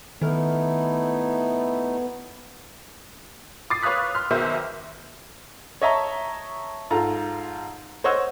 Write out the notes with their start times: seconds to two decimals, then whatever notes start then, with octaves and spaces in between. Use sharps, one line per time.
0.22 D#3 A3 B3 D#4 E4 A4 F6
3.70 D6 D#6 A6 C7
3.82 B4 C#5 F5 D#6 F#6 B6
4.15 C6 F6
4.30 B1 B2 D#3 C5 E5
5.82 C#5 D#5 E5 A5 A#5 C#6
6.90 G#2 F4 A4 A#5
8.04 C5 C#5 D#5 F#5 E6